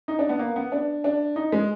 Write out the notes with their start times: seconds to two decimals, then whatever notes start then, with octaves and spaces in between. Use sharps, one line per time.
0.08 D#4
0.19 D4
0.29 B3
0.39 A#3
0.56 B3
0.72 D4
1.04 D4
1.36 D#4
1.52 G#3